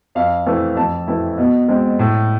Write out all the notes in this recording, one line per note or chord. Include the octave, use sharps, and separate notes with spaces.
F2 F5
E3 A3 C4 E4
F2 A5
E3 A3 C4 E4
B2
G#3 C4
A2